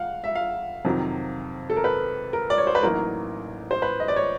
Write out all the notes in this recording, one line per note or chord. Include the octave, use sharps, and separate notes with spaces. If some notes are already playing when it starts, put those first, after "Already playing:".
Already playing: F5 F#5
E5
F5
F2 C3 D#3 F#3
A4
A#4
B4
A#4
D5
C#5
C5
B4
A1 A2 F#3 A#3 D#4 A#4
C5
B4
D#5
D5
C#5